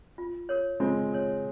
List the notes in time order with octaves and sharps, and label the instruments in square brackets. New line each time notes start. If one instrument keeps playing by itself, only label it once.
[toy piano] F4
A#4 C#5
[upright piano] G#3 C4 [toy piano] F4
[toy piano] A#4 C#5